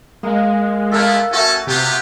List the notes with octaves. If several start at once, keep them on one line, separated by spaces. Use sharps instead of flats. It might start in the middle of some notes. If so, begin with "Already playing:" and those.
G#3 A#3
A3 B3 E4 A4 A#4 F5
A3 C#4 F#4 A4 G#5
C3 B3 F4 G4